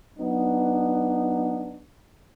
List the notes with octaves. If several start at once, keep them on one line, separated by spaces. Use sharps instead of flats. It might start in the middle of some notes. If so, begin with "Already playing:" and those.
F#3 B3 D4 D#4